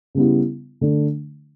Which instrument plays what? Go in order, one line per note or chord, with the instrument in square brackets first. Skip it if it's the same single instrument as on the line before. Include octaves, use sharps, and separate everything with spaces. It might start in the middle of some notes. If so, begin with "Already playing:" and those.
[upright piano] C#3 G3 B3 E4
D3 A3 D4